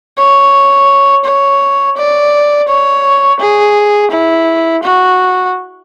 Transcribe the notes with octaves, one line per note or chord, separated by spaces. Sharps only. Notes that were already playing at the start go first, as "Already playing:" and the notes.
C#5
C#5
D5
C#5
G#4
E4
F#4